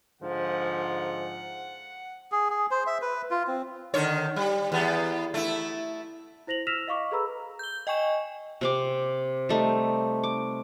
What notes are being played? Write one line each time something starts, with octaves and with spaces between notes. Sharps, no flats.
G#2 D3 F3 F#5
G#4
G#4
C5
E5
B4
F4
C4
D3 D#3 C#5
G3
E2 B3
A3 E4
E4 C5 A#6 F7 F#7
E6 F6 A#6 B6 E7 F7
D#5 F5 C#6 D6
G#4 A4 B4 A#5 B5 E6
G6 G7
D#5 G5 G#5 C#6 E7
C3 C4 D6
G3 A3 D#4
D6